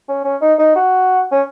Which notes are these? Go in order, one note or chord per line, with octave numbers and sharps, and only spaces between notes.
C#4
C#4
D#4
D#4
F#4
C#4